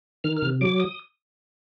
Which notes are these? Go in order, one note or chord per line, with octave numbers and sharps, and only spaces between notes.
D#3 F6
F6
C3
F#3 D6
D#6